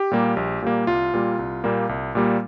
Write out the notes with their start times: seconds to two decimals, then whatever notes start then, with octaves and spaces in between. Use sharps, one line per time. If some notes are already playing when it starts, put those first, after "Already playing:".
Already playing: G4
0.11 A#2 G3 A#3
0.37 A#1
0.62 A#2 G3 A#3
0.87 C2 F4
1.14 A#2 G3 A#3
1.39 C2
1.64 A#2 G3 A#3
1.89 C2
2.15 A#2 G3 A#3